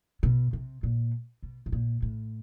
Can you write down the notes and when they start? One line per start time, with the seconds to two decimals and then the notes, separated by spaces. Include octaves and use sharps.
0.23 B2
0.53 C3
0.83 A#2
1.43 B2
1.66 A2
1.72 A#2
2.02 A2